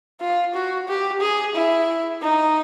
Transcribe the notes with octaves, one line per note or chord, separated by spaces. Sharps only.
F4
F#4
G4
G#4
E4
D#4